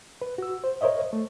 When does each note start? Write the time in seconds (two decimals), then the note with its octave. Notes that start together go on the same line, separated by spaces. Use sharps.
0.22 B4
0.38 F#4 E6
0.64 C5
0.81 A#4 C5 C#5 D#5 E5
1.13 A3